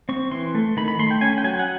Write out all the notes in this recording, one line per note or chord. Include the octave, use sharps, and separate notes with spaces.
C4 C#6
E3 C6
A3
D#3 B5
B5
A3 C6
G5
C#4 G#5
G5
F#3 G#5
F#5